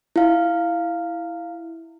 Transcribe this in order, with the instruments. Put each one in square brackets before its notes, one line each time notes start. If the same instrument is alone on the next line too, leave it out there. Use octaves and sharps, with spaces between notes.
[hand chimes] E4 F5